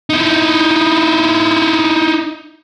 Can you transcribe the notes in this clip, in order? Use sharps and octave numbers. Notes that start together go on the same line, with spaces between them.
D#4 E4